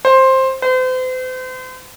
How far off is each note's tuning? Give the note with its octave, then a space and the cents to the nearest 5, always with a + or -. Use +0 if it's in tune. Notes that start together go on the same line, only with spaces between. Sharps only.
C5 +10
C5 -40